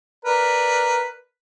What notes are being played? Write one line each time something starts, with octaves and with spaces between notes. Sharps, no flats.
A#4 B4 D5